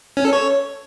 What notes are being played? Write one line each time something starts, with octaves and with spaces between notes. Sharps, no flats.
C#4
A4
C#5